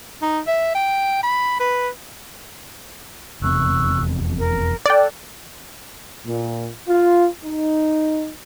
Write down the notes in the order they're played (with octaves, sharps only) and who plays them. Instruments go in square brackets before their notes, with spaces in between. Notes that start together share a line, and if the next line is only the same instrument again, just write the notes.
[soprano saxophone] D#4
E5
G5
B5
B4
[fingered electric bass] F1 E2 C3 [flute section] C#6 E6 F#6
[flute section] A#4
[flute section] A4 F#6 [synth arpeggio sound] D5 G5
[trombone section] A#2
F4
D#4